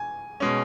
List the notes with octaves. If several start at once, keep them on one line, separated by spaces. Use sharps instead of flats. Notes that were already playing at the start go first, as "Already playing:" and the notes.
Already playing: G#5
B2 G#3 C#4